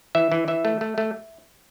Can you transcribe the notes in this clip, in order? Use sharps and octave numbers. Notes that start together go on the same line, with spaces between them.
E3 E5
E3
E3 E5
A3
A3
A3